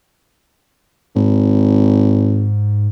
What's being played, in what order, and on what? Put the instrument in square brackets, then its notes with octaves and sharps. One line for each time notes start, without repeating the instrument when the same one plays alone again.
[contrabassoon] G#1 [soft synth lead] G#2